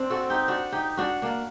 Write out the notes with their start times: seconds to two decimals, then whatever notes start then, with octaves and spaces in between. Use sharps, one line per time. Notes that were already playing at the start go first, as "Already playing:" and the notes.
Already playing: C4 D4
0.10 F#4 A4
0.30 D#4 G4
0.48 D4 F#4
0.72 D#4 G4
0.97 D4 F#4
1.22 A#3 D4